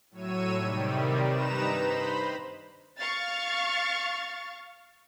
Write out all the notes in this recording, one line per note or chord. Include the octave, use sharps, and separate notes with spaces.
A2 F#3 C#5 E6 D#7
C3 D#3 G3
G2 D#4 B4 A#5 E7
C5 B5
F5 C#6 F6 A6